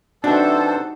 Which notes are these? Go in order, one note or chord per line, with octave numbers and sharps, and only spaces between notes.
C3 E3 G3 D4 D#4 F#4 A4 C5